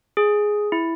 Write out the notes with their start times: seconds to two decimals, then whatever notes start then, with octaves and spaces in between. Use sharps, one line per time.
0.17 G#4
0.72 E4